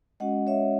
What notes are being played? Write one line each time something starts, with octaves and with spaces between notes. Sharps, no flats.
G#3 C#4 F#4 D#5 F#5
C#5 E5